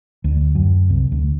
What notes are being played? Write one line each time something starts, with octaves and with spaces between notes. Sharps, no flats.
D2
F#2
C2
D2